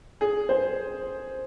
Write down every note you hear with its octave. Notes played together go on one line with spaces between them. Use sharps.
G#4
C5